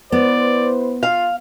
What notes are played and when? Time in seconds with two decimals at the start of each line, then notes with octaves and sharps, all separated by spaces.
0.12 B3 E4 B4 C5 D5
1.03 F4 F5